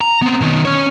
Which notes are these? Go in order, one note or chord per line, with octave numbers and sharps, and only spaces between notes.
A#5
B3 C4
B2 D#3
C#4 C#5